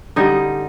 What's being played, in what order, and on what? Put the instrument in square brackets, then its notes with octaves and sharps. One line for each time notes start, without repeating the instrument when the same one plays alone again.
[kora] D3 G3 D#4